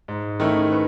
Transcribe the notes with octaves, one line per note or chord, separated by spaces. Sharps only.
G#2
D#3 A3 C#4 E4
B4